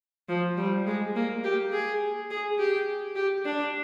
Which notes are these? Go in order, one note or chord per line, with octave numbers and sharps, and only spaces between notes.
F3
G3
G#3
A#3
G4
G#4
G#4
G4
G4
D4